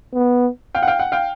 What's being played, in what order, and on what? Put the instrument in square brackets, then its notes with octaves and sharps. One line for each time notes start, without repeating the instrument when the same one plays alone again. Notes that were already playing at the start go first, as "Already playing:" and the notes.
[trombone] B3
[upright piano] F5 G5
F#5
F5 G5
F#5
F5 G5